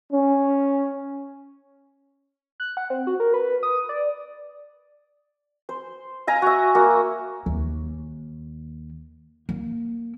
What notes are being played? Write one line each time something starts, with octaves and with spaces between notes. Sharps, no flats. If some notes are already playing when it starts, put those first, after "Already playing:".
C#4
F#6
F#5
C4
F#4
A#4
B4
D#6
D5
C5
F5 G#5 A#5
F#4 E5
A#3 F#4
D#2
A#3